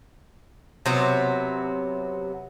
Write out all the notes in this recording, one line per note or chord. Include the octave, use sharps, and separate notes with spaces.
C3 F#3 B3